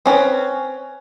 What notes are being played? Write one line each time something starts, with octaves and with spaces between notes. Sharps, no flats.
C4 C#4 B4